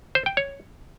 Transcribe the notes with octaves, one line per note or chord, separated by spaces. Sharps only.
C5
G5
C#5